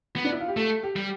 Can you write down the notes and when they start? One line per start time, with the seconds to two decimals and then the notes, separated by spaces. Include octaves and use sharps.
0.16 B3
0.25 D4
0.32 E4
0.41 F4
0.48 G4
0.56 A3 A4
0.83 G4
0.96 G3